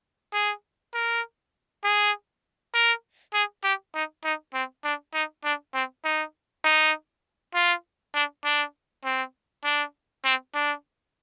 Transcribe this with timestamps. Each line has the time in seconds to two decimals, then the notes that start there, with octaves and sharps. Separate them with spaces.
0.33 G#4
0.94 A#4
1.84 G#4
2.74 A#4
3.34 G#4
3.64 G4
3.95 D#4
4.24 D#4
4.54 C4
4.84 D4
5.14 D#4
5.44 D4
5.74 C4
6.04 D#4
6.64 D#4
7.55 F4
8.14 D4
8.45 D4
9.04 C4
9.65 D4
10.25 C4
10.54 D4